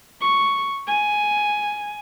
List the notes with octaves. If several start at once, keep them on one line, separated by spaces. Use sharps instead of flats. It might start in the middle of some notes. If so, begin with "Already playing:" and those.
C#6
G#5